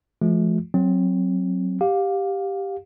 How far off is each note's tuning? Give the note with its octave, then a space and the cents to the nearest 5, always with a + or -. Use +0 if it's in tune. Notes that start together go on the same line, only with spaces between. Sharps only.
F3 -35 A3 -45 F4 +45
F#3 +0 C4 +15
G4 +0 F5 +25